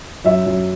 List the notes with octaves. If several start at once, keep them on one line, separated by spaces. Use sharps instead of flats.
F#2 E5
F#2